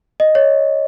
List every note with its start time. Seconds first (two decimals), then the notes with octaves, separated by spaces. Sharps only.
0.20 D#5
0.35 C#5